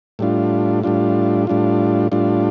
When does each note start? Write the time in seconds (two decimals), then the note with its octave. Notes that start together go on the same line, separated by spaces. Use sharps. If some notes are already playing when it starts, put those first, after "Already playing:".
0.19 A2 G3 D4 F4
0.84 A2 G3 D4 F4
1.47 A2 G3 D4 F4
2.12 A2 G3 D4 F4